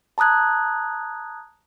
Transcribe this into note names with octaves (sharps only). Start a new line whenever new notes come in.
A5 A#5 D#6 F#6 G#6